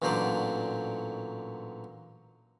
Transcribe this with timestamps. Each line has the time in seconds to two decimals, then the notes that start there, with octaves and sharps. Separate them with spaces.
0.02 A1 A#2 D3 F#3 C5 D5